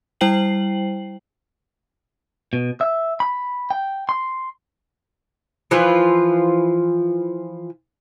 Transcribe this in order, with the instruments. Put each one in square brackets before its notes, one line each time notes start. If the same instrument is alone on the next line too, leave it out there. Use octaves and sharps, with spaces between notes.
[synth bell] G3 E4 C5 G5 C7 F#7
[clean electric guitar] B2
E5
B5
G5
C6
[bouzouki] E3 F3 F4 B4